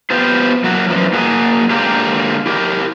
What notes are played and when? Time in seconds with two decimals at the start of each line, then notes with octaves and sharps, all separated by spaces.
0.10 B3 F4 G4 C5
0.64 F#3 A#3 E4 F#4
0.90 F#2 E3 F3
1.13 A#3 F#4 G#4
1.70 D3 G#3 A#3 F4 G4 A#5
2.46 E4 G4 A#4